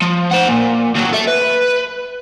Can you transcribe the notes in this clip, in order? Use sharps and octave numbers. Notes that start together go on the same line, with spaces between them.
F3
C5 F#5
A#2
D#2 F#3
A4 E5
B4